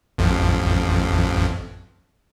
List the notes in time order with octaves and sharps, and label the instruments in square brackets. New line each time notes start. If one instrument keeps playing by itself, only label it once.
[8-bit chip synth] A1 F2